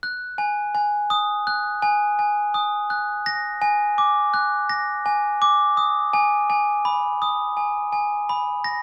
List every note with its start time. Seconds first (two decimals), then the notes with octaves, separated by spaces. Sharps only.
0.03 F#6
0.38 G#5
0.75 G#5
1.10 D#6
1.47 F#6
1.82 G#5
2.19 G#5
2.54 D#6
2.90 F#6
3.26 A#6
3.62 G#5
3.98 D6
4.34 F#6
4.69 A#6
5.06 G#5
5.42 D6
5.77 D#6
6.13 G#5
6.50 G#5
6.85 B5
7.22 D#6
7.57 G#5
7.93 G#5
8.29 B5
8.64 A#6